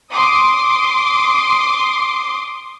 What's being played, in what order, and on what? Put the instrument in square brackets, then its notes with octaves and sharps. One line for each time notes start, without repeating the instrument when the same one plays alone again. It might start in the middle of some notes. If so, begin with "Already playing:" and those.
[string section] C6 D6 D#6